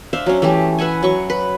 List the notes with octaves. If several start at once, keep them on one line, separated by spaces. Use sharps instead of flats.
D4 C5 E5 F5
F#3 C#4
E3 A3 C#4 G4
B4 E5 F#5 G#5
F#3 C#6
B4